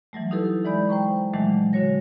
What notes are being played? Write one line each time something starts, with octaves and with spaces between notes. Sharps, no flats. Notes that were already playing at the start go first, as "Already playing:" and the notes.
E3 F#3 G3 A3
D#4 E4 G4 A4 B4
E3 G#3 D5 B5 G6
C5 G5 A#5 C#6
A#2 D#3 E3 F#3 G#3 A3
D3 D#3 F#4 C#5 A#6